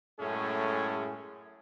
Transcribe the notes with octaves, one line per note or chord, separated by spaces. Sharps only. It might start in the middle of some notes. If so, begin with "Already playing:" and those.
F#2 A2 G#3 A3 C#4 G#4